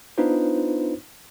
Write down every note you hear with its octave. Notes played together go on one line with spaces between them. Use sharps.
B3 D4 D#4 F4 B4 C5